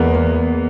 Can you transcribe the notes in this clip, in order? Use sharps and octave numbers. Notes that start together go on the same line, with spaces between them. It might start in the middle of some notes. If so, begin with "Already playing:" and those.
Already playing: E2 E3 G#3 A#3 B3
A#3